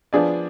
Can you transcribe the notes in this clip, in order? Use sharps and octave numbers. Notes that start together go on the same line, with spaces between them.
F3 B3 D4 G#4 D5